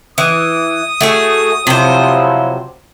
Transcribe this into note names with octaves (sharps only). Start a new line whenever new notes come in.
E3 D#6
A3 F#4 G#4
C3 F3 F#3 E4 C5